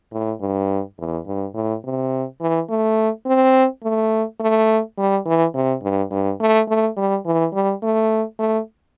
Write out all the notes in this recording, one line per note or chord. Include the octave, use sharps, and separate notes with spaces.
A2
G2
E2
G2
A2
C3
E3
A3
C4
A3
A3
G3
E3
C3
G2
G2
A3
A3
G3
E3
G3
A3
A3